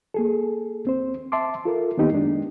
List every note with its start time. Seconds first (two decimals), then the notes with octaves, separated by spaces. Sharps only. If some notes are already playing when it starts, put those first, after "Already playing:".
0.14 A#3 G#4 A4
0.85 D#2 C4 C5
1.32 E5 A5 C6 D6
1.65 F4 A4 A#4
1.97 D#3 A#3 B3 D#4 G4
2.11 F#2 G#3 D4